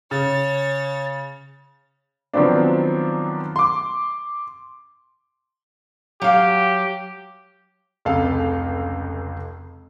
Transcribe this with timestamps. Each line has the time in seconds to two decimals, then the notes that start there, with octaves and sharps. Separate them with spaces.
0.11 C#3 C#5 A6
2.33 D#3 F3 F#3 B3 C4 D4
3.56 C6 D6
6.22 F#3 G4 F5
8.05 F1 C#2 G#3 A4 F5